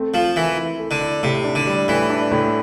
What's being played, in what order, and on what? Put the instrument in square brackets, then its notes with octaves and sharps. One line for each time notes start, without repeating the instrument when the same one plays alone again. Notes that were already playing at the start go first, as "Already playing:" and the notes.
Already playing: [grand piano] A3 C4
[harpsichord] F3 [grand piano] A3
[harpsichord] E3 [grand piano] A#4
[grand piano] E4
A3
[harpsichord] D3
[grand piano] E4
[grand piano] A2 [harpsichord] C3
[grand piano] D4
[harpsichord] D3
[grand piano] G3
[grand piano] A2 [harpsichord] E3
[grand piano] D4
A2